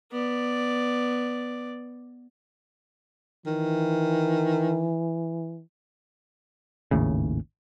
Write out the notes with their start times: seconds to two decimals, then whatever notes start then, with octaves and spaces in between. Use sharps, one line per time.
0.12 B3 D5
3.46 D#3 E3
6.91 G#1 D#2 A2 C#3